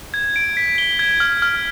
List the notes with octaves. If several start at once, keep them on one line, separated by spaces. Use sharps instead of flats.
G#6
D7
B6
G7
G#6
F6
F6